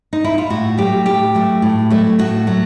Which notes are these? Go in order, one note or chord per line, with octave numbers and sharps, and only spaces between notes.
D#4
E4
F4
A2 F#4
F#3 A3 G4
A2 G4
F#3 A3
A2
F#3 A3
A2 F#4
F#3 A3